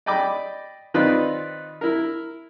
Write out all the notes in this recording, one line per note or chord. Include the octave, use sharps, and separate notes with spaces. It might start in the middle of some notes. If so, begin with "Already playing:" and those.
D5 D#5 G5 B5 D6
D#3 C4 D#4 F4 B4 D5
E4 A#4